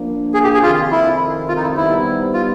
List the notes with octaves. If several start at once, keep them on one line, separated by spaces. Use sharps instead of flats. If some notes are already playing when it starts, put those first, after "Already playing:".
Already playing: F3 A#3 D4
G#4
G4
G#4
F2 C3 D#3 F4
E4
F4
D#4
E4
G3 B3 D#4 E4 G4 C5
F4